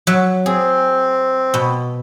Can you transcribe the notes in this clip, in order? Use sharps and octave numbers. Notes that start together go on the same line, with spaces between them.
F#3 E5
C4 G#4
B2